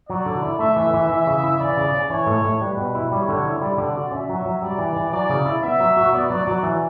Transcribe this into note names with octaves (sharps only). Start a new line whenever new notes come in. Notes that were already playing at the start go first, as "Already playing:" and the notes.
F#3 D5
D3
E4
A3 E5
E3
E3
E3 E5
C#3
E4
E3 D5
C#3
C#4
E3 C#5
A2
A2
G3 B4
B2
E4
G3 C#5
D3
E4
G3 D5
D3
F#4
C#4 E5
F#3
F#3
G3 D5
E3
E3
F#3 D5
C#3
E4
B3 E5
F#3
F#4
B3 D5
F#3
F#3
E3